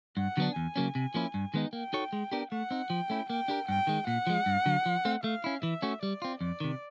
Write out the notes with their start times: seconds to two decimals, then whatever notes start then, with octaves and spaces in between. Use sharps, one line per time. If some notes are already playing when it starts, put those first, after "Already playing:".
0.17 G2 F#5
0.37 D3 F#3 B3 D4
0.56 E2 G#5
0.76 C#3 F#3 A#3 C#4
0.95 C3
1.14 F3 A#3 C#4 E4
1.34 G2
1.54 D#3 G#3 B3 D#4
1.73 A#3 G5
1.93 D#4 F#4 A4 C#5
2.13 G#3
2.32 B3 D4 G4 A#4
2.51 A3 F#5
2.71 C4 D#4
2.90 F3 G5
3.10 A3 C#4 E4
3.30 A#3 G5
3.48 D4 G4 A#4
3.69 G2 G5
3.87 D#3 G#3
4.07 A#2 F#5
4.27 F3 G#3
4.46 G2
4.66 D3 F#3
4.86 F3
5.05 A3 C4
5.24 A3 F5
5.44 C#4 E4
5.63 E3 E5
5.82 A3 C#4 F#4
6.03 G3 D5
6.22 C4 F4
6.41 F2 D5
6.60 C3 D#3